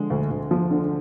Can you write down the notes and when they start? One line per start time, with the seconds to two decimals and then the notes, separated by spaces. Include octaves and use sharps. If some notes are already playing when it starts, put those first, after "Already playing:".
Already playing: D3 F3 G#3
0.10 D2
0.31 D2
0.51 F3
0.71 D3